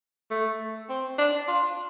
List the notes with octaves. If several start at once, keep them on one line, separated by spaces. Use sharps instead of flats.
A3
C4
D4
F4